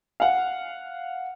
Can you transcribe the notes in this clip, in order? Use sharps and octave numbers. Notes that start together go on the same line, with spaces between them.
F5 F#5